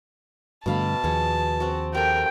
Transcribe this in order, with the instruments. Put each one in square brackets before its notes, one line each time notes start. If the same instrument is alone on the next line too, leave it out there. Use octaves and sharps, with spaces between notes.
[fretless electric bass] G2 D3 A3 [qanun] B2 F5 B5 [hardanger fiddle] A5
[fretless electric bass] D#2 F3 [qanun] B3 G#4
[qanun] C4 F#4
[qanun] G4 A4 [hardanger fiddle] A#4 [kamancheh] G5